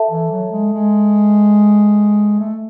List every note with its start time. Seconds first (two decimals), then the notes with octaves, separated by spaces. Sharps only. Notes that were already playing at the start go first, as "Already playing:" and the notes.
Already playing: A4 E5 A5
0.10 E3
0.31 F#3
0.52 G#3
0.73 G#3
2.39 A3